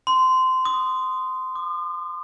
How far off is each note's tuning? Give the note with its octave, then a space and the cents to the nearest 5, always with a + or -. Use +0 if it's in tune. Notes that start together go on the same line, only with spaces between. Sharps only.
C6 -20
D#6 -10
D#6 -45